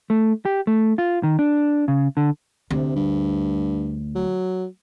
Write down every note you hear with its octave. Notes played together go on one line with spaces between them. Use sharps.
A3
G4
A3
F4
D#3
D4
C#3
D3
D2 C3
G2
F#3